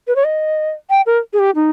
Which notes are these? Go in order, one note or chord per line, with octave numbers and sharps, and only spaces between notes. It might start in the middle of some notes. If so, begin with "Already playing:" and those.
B4
C#5
D#5
G5
A#4
G#4
G4
D#4